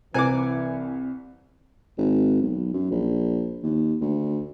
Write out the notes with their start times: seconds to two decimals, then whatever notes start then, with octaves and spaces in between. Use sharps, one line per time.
0.14 C2 E3 E4 C5 G#5 A#5 D6 C#7
1.98 G#1
2.42 B1
2.73 F#2
2.90 A#1
3.63 D#2
4.01 D2